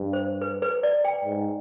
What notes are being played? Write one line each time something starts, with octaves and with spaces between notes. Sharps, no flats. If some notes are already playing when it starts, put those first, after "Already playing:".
Already playing: G2
C5
B4
B4
D5
G5
G#2